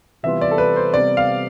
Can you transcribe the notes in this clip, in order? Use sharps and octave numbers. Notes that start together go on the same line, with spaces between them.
C3 E3 G3 B3 F4 E5
D5
A4
B4
C5
C3 G3 B3 D5
F5